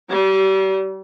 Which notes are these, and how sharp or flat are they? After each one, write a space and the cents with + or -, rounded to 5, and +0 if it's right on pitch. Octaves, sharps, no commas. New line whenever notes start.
G3 -35